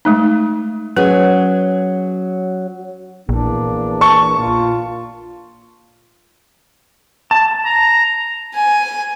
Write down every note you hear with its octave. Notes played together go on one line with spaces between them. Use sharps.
G#3 A3 D#4
F#3 C#4 G#4 B4
A#1 E2 E3 A#3 D4
A5 C#6
A#2 F4
A5
A#5
G#5